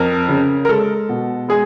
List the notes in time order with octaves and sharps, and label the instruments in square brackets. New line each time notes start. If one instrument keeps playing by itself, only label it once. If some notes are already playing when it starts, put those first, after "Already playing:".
Already playing: [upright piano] F2 A#4
C#3
A#4
G#3 A4
B2
G#3 G#4